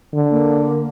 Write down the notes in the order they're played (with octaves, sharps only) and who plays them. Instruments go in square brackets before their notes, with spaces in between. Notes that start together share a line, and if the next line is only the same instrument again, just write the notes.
[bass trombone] D3
[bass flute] A#3